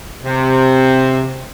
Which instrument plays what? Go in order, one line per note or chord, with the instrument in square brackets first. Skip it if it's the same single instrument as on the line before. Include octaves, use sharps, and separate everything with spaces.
[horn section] C3